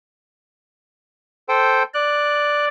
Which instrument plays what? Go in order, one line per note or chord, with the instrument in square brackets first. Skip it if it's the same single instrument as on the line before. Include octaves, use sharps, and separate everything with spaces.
[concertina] A4 C5 G5
[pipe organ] D5 [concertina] F#6